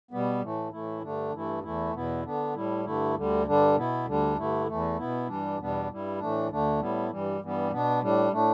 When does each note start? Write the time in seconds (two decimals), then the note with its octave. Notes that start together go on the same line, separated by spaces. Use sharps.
0.11 B2 G3 B3
0.41 A2 E3 A3
0.72 A2 E3 A3 E4
1.02 G2 D3 A3 D4
1.33 G2 E3 A3 E4
1.63 E2 E3 A3 E4
1.94 E2 B2 B3 E4
2.25 D3 B3 D4
2.55 A2 G3 E4
2.85 G2 D3 A3 E4
3.15 D2 D3 G3
3.46 G2 D3 G3 D4
3.76 B2 B3 E4
4.06 D2 D3 G3 D4
4.36 G2 D3 A3 E4
4.67 E2 E3 A3
4.98 B2 B3 E4
5.28 G2 E3 G3 D4
5.58 E2 B2 G3 B3 D4
5.89 G2 G3 E4
6.19 A2 E3 A3 D4
6.50 D2 D3 A3 D4
6.80 A2 G3 B3 E4
7.11 G2 E3 G3
7.41 G2 E3 G3 B3
7.71 B2 B3 D4
8.01 A2 G3 D4
8.32 A2 A3 D4